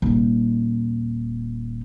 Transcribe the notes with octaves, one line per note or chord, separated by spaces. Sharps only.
D#1 D#4